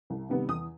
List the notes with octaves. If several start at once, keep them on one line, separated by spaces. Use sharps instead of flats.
C2
C3 D#3 G3 B3
E2 D#6